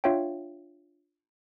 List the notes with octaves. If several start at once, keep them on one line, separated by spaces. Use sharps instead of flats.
D4 F4 C#5 E5 F5 G5